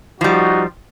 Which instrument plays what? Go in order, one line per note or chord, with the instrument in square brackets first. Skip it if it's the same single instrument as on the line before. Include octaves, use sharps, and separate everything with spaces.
[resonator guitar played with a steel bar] F3 G3 [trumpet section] D#4 F#4